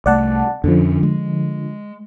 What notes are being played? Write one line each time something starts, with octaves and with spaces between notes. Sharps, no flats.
C2 A3 D5 F#5 A5
F2 D3 F3 B3 C#4
G#3